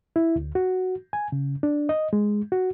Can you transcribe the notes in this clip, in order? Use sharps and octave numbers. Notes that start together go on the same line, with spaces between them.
E4
D2
F#4
G#5
C#3
D4
D#5
G#3
F#4